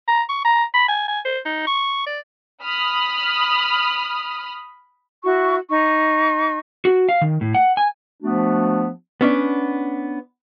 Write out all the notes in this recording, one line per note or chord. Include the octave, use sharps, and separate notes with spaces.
A#5
C#6
A#5
B5
G#5
G#5
C5
D#4
C#6
D5
B5 D#6 F6
E4 F#4 C#6
D#4 C#6
F#4
F5
D#3
A2
F#5
G#5
F3 A3 B3 D4 F#4
B3 C#4 D4